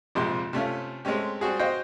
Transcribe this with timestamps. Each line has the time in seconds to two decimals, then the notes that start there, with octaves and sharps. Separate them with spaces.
0.15 A#1 F2 C3 G#3 C6
0.53 C3 A3 C#4 F4
1.05 G#3 A3 C4 C#4 G4
1.41 G3 C4 F#4 G#4
1.59 F#4 C5 D#5 F5 G5